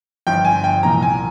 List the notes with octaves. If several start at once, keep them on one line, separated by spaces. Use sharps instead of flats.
G1 G2 F3 G5
G#5
G5
C2 A#2 F3 A#5
G#5